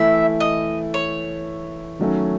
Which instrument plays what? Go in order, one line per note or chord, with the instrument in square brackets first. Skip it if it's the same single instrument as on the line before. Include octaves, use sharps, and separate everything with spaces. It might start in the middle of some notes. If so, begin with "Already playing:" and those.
Already playing: [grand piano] E3 A3 E4 [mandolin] E5
[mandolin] D#5
C#5
[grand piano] D#3 F#3 A3 C#4